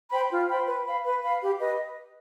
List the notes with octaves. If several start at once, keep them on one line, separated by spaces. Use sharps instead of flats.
C5 G5 B5
F4
C5 G5 B5
B4
F5 B5
B4
F5 B5
G4
B4 D#5